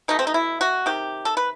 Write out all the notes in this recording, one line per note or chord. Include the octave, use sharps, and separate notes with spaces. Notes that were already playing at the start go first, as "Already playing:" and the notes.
B2 A3 D#4
C4
D#4
E4
F#4
C3 D#3 G4
A4
B4